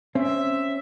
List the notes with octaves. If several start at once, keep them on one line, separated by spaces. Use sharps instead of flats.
C4 C#4 E5